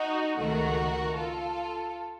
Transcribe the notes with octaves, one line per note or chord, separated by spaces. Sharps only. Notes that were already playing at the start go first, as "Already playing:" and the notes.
Already playing: D#4 F#4
C#2 C3 D#3 A3 F#4 A#4
F4 A4